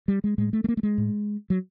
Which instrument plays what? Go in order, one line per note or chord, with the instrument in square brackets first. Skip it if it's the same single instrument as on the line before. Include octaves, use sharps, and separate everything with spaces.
[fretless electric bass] G3
G#3
A2 G#3
A3
A3
A#3
A3
G#3
A2
F#3